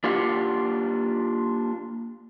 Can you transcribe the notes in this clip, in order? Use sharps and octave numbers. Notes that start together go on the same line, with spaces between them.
A#3 D4 F4 G4 F5 F#5